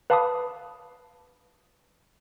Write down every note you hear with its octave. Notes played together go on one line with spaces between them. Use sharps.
B4 F5 A5 B5 D6 D#6